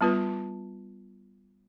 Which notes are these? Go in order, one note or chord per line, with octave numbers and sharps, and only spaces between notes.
G3 B3 F4 B4 A5